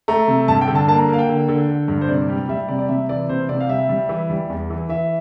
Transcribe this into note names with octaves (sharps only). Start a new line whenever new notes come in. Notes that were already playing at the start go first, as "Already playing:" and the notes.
A3 A#5
C3
G2 A5
G5
D3
A5
A#3 A5
A#5
A#3 F5
G5
D3
D3
D3
G2
C5
C3 D5
G3
G3 E5
C3 D5
D5
C3 E5
E3 D5
C3 C5
C3 D5
F5
G3 E5
G3
E3
G3
E2
E3
E3 E5